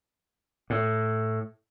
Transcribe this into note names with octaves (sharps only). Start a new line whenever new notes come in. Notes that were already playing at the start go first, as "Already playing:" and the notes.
A2